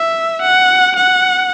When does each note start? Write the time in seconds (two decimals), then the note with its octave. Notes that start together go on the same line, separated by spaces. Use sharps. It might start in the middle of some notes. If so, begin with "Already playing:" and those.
Already playing: E5
0.42 F#5
0.96 F#5